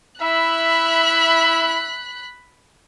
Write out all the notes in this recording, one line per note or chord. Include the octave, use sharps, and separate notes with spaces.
E4 E5 B5 F#6